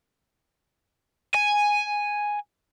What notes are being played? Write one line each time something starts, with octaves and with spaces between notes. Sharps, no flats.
G#5